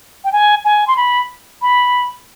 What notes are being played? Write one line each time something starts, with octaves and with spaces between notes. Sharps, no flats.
G5
G#5
G#5
C6
B5
B5